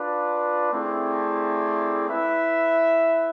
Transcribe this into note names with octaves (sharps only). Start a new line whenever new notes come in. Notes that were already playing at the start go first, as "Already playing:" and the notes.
Already playing: D4 F4 B4 D5
A3 C4 E4 G#4 D5
E4 B4 E5